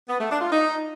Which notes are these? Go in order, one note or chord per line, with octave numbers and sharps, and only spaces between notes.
B3
A3
D4
F4
D#4